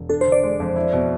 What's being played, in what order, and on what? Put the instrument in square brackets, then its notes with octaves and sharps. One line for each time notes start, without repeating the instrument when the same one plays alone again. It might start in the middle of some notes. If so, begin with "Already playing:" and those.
Already playing: [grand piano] E1
[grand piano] D4 [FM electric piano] A4
[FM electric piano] C5
[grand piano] D3
[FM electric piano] D5
[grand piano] G#3
F2
E4
B2